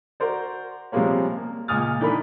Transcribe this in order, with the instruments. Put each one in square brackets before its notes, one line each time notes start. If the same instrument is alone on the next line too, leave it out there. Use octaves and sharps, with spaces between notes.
[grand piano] F#4 A#4 C5 D5
C3 F3 G3 G#3 A#3 C#4
A#3
C#2 A#2 G#5 D#6 F6 A6
D3 E3 D4 D#4 A#4 B5